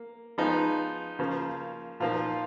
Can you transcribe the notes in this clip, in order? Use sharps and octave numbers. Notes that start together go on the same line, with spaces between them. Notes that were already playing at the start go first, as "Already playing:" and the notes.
Already playing: A#3
F3 G#3 B3 D#4
C#3 F3 A#3
A#2 F3 A#3 D#4 F4